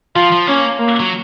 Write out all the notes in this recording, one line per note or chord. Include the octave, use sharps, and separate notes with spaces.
F3 F4
F3
A#3 C#4
A#3
F#3